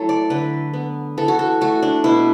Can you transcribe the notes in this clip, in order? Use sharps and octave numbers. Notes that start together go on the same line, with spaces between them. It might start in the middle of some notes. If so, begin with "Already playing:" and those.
Already playing: F#3 A3 E4 A4
D5
D3 B4
B3
E3 A4
F#4
A4
A3 F#4
D4
B2 E4